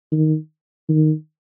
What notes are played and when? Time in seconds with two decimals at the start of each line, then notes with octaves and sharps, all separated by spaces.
0.12 D#3
0.89 D#3